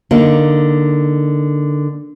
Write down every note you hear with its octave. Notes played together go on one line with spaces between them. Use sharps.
D3 A#3 D#4